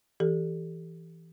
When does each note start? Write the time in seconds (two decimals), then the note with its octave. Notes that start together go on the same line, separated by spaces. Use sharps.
0.20 E3 G4 A4